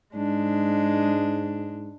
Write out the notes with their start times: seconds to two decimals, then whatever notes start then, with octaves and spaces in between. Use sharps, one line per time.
0.14 G#2 G#3 D4